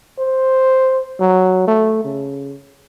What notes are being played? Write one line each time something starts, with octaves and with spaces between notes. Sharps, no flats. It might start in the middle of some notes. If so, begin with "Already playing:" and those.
C5
F#3
A3
C#3